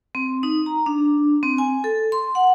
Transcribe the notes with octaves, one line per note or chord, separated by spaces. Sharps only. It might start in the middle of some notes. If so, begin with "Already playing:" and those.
C4
D#4
A#5
D4
C4
G#5
A4
C6
F#5